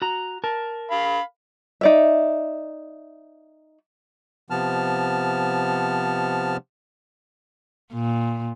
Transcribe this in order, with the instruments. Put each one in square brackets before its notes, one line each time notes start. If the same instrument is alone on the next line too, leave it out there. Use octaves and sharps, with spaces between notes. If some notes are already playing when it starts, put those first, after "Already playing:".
[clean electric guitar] F#4 A#5
A#4 A5
[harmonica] F5 B5
[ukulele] D#4 D5 E5
[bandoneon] C3 F3 B3 A5 F6
[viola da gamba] A#2